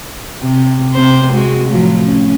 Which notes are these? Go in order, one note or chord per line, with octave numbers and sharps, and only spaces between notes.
C3
C3 C4 C5
G#3 F#4
A2 F3 F#3
C#4